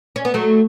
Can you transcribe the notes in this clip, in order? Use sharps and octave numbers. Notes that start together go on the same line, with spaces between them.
C#4
B3
F#3 A3